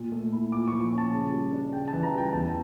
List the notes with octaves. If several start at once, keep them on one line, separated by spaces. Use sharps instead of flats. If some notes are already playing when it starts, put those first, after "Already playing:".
Already playing: A#2
A3
E4
A#2 D6
F3 C#6
C#4
A5
C#3
G3
D4
C#3 G5
A5
E3
A#5
G3 G5
E2 A5